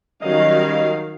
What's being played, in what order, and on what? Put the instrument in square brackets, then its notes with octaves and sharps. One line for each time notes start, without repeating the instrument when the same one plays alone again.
[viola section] D#3 F#3 F5 [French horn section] G3 C#4 [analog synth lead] D#5